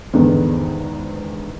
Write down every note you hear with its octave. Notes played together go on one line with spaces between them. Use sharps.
E2 G#2 D3 D#3 G#3 B3